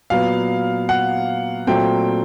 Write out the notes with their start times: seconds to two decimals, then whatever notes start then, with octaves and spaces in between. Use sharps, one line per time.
0.10 A#2 F#3 B3 F5
0.89 F#5
1.67 A#2 F#3 A3 C4 G5